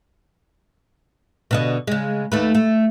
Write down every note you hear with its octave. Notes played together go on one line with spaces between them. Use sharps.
B2 D3 D#5
C#3 G#3
D#2 A3 B4
A3